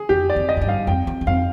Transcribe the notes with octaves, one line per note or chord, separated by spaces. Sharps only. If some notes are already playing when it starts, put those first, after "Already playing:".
Already playing: G#4
F2 G4
D5
F2
D#5
G#2
G2
F5
F2 G5
F2
G2
F2 F5